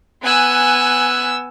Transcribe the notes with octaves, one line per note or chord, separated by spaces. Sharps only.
B3 G#5 E6 F#6